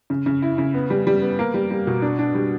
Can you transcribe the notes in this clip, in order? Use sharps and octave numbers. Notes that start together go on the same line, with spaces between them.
C#3
C#3
E4
C#3
B3
G3
G3
B3
A#3
G3
G3
B2
D4
D4
G3